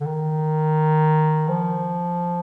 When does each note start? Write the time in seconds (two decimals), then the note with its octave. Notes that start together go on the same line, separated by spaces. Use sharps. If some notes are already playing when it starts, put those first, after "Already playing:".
0.01 D3
0.06 D#3
1.48 F3